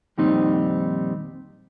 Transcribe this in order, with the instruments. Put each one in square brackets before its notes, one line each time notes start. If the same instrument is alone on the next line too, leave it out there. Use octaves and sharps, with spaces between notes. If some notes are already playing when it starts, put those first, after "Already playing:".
[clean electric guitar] F2 A#2 D#3 G3 C4 D#4